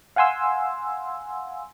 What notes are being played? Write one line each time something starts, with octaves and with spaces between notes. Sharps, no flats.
F5 F#5 G#5 C6 E6